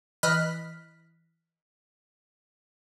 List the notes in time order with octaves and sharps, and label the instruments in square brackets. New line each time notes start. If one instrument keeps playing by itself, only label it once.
[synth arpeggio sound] E3 D#5 B5 F6 F#6 B6